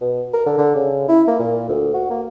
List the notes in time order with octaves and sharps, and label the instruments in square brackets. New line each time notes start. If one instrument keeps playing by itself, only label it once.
[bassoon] B2
A#4
D3
D3
C#3
E4
A#3
A#2
D2
F#4
A#3